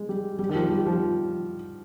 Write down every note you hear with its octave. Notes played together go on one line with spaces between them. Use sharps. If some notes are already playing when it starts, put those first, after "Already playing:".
Already playing: G#3
G3
G3
D#3
F3
G3
F3